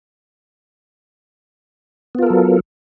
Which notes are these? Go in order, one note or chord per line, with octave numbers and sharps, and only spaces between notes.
F#3 B3 F4 A4 A#4